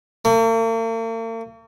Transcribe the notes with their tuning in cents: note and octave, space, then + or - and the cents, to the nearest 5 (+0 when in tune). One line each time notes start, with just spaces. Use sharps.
A#3 -45